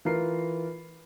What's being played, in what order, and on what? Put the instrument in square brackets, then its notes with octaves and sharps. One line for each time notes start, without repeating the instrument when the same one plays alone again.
[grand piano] E3 F4 A#4 C7